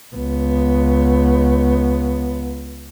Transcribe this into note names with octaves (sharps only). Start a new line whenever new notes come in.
C#2 B3